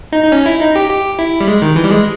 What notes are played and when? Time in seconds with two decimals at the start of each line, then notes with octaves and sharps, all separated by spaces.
0.12 D#4
0.24 D#4
0.32 C#4
0.46 E4
0.61 D#4
0.75 G4
0.90 G4
1.19 E4
1.41 G3
1.48 G#3
1.62 D#3
1.76 E3
1.84 G3
1.91 G#3